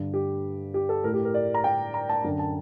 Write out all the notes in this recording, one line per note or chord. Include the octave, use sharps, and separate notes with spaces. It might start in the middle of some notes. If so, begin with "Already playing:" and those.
Already playing: G2 D3
G4
G4
A4
A2 A#4
G4
A#4
D5
A#5
G5
A#5
A5
F#2 D3
A5